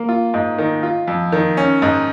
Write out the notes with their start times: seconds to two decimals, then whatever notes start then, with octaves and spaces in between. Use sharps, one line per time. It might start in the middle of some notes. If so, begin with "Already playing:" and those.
Already playing: A#3
0.09 F4
0.34 G#2
0.58 D#3
0.83 F4
1.08 F2
1.32 D#3
1.57 C#4
1.82 G#2